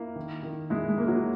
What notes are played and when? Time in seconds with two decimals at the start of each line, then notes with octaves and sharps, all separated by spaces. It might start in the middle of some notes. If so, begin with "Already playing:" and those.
Already playing: A#3 E4
0.16 D#3
0.43 D#3
0.70 G#3 E4
0.89 G#3
0.98 A#3
1.07 F#3